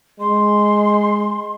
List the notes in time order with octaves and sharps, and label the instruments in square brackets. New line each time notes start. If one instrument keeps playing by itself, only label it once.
[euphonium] G#3 [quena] C6